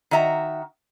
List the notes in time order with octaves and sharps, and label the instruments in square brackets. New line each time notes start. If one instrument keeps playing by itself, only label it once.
[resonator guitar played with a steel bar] D#3 F#4 E5 A#5